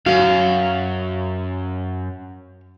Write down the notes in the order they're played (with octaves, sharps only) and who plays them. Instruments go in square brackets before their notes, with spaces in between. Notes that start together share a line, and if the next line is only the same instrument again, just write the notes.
[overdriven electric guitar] F#2 [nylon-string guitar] F#4 [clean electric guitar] C#5 F5